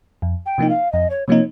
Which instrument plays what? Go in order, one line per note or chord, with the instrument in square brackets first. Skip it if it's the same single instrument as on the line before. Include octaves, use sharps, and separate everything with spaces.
[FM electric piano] F2
[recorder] G5
[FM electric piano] C3 F3 A#3 D#4
[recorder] F5
[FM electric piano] F2 [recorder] D#5
[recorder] C#5
[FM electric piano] C3 F3 A#3 D#4 [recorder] C#5